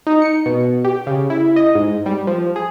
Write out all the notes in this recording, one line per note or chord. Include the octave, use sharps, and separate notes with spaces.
D#4
C#7
B2
G4
C#3
E4
D#5
G#2
G3
F3
G#4